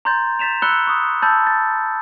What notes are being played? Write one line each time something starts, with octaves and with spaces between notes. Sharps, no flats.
A#5 C6 G6 A6
G6 A6 B6 E7 F7
B5 E6 F#6 C#7 G7
C#6 D#6
A5 B5 E6 G6 A6
A6